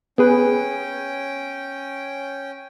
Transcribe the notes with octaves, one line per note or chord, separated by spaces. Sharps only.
B3 C#4 G#4 B4 G5